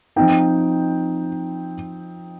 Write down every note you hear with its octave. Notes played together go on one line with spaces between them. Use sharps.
F3 C4 D#4 G5